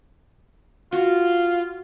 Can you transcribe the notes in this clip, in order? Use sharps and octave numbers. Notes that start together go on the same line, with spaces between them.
F4 F#4